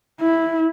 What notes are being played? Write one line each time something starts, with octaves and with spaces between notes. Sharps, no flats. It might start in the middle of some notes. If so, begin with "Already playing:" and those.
E4